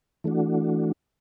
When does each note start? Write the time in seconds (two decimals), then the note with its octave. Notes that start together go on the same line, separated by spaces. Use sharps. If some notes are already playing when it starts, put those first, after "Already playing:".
0.24 E3 A3 D4 F#4